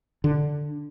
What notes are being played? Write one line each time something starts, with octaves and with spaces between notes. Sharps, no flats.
D3